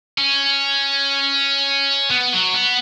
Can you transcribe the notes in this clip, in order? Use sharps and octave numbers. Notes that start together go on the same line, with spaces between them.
C#4
B3
F#3
B3